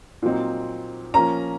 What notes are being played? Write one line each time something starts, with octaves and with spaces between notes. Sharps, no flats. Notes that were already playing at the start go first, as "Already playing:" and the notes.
A#2 F#3 C4 D#4
F3 A#3 C#4 A#5